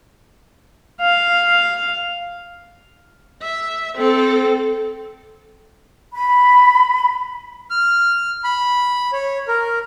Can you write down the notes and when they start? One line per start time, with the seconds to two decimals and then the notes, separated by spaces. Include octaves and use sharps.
1.01 F5
3.42 E5
3.96 C4 A4
6.14 B5
7.71 F6
8.44 B5
9.13 C#5
9.48 A#4